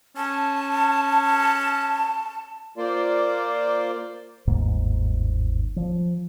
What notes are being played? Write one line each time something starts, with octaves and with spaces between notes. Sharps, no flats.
C#4 A5
A#3 F4 C5 D5
G1 D#2 G#2 A#3
F3